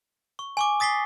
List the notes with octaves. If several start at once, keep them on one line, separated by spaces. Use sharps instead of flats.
C#6
G#5 C#6 D6
D#6 A6 B6 C7 G7